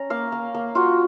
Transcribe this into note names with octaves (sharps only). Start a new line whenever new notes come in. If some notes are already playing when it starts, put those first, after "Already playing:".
Already playing: C#4 A#5
A#3 F5
A#3
A#3
F4 F#4